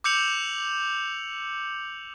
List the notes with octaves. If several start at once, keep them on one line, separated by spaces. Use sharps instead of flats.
D6 E6 G6 C#7 F7 F#7